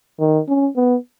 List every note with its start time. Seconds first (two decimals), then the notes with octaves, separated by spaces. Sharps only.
0.20 D#3
0.48 C#4
0.76 B3